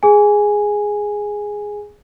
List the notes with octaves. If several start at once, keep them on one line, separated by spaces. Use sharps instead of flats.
G#4 G#5